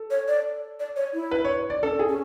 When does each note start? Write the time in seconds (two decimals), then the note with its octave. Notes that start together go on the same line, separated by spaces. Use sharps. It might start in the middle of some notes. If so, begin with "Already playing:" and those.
Already playing: A4
0.11 C#5
0.28 D5
0.80 D5
0.96 C#5
1.14 E4
1.31 B4
1.45 C#5
1.70 D5
1.82 C#4 A4
1.99 G#4
2.08 C#4